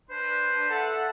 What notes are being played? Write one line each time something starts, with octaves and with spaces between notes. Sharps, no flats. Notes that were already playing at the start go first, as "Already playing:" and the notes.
D4 B4 C5
A4 E5 F#5 A5